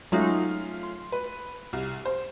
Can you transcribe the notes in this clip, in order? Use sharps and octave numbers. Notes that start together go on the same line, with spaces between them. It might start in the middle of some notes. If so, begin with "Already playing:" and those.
F#3 G#3 A3 C#4 D#4 F4
C6
B4
C2 F6
C5